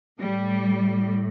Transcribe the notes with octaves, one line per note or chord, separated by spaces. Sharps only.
A2 G3